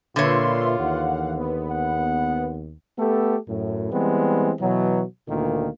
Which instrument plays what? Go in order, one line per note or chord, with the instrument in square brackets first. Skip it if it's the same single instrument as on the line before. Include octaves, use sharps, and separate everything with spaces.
[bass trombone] A#2 [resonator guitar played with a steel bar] D3 C#5 [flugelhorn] F4 [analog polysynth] B4 E5 C6
[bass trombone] D#2 [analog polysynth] E3 F5 F#5
[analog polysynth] B3
[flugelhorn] F#5
[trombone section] A3 B3 G4 A4
F#2 A2
E3 G3 G#3 B3 C4
B2 E3 F#3
D2 A#2 D#3 A#3